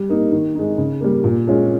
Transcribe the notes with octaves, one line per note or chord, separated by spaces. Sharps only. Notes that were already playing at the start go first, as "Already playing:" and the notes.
Already playing: G3
A#3 D#4
D#3
G#3 D#4
C#3
G3 A#3
A#2
G#3 C#4 F4